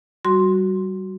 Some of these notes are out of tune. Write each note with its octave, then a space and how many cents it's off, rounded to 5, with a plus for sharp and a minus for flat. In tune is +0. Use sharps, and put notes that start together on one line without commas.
G3 -30 F#4 +0 C6 +0